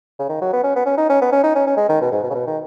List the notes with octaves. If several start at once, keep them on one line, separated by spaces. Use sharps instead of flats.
C#3
D#3
F#3
B3
C#4
B3
C#4
D#4
C#4
B3
C#4
D#4
C#4
C#4
G#3
D#3
B2
G#2
B2
C#3
B2
D#3